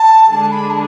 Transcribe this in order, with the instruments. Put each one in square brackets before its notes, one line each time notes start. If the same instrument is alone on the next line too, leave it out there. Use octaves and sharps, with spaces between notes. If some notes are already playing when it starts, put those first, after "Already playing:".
Already playing: [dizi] A5
[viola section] D3 G#3 D4 G#4 [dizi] A5
[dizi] B5
A5